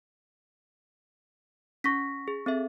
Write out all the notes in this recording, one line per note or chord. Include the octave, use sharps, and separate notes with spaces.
C#4 C#6 A#6 B6
G#4
C4 A4 E5